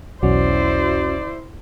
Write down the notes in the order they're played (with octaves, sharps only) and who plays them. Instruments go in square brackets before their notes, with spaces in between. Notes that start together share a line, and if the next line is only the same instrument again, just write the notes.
[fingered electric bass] B1 [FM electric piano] E2 C#4 F#4 [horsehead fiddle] E4 C5 [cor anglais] D5